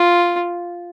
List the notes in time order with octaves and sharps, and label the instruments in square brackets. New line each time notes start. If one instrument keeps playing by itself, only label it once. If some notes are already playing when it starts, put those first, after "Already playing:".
Already playing: [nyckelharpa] F4